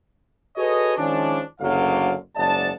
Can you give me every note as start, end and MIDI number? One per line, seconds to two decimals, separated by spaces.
0.56 0.95 66
0.56 0.95 68
0.56 0.95 69
0.56 0.95 71
0.56 0.95 73
0.56 0.95 75
0.97 1.41 51
0.97 1.41 53
0.97 1.41 56
0.97 1.41 61
0.97 1.41 62
1.60 2.13 30
1.60 2.13 38
1.60 2.13 50
1.60 2.13 54
1.60 2.13 74
1.60 2.13 77
2.36 2.70 30
2.36 2.70 44
2.36 2.70 74
2.36 2.70 75
2.36 2.70 78
2.36 2.70 81